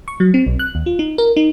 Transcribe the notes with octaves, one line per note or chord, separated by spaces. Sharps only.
C#6
F#3
C4
B1
F#6
D#2
F4
D#4
A#4
D#4